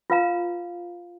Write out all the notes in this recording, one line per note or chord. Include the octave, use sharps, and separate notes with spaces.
F4 B4 F5 A#5